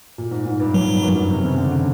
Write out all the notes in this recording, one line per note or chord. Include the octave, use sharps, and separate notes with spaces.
A#2
G#2
G#2
G2
G2 F#3
G2
F#2
G2
C3
C#3
D3
D3